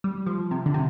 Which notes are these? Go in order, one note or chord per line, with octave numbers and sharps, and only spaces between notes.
G3
F3
C3
D3
C3